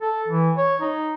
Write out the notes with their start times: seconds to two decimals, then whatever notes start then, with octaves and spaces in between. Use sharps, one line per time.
0.02 A4
0.28 E3
0.57 C#5
0.81 D#4